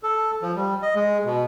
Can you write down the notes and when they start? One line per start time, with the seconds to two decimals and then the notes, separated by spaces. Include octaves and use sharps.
0.03 A4
0.42 F3
0.56 G3
0.82 D#5
0.95 G#3
1.25 B2